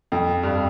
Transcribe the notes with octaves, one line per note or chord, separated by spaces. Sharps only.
F2
G2